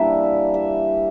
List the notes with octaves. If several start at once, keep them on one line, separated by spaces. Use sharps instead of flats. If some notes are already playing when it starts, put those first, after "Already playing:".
Already playing: E3 G3 A#3 D4 E5
E5